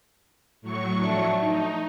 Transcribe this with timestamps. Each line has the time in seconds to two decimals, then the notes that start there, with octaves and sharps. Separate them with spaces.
0.62 A2 F#3 C#6
1.01 F3 A3 D4
1.38 D#4